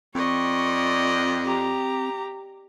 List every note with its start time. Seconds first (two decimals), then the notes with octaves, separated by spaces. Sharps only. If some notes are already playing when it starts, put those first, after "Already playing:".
0.15 F2 C4 D5 D#5 C#6
1.46 G4 A#5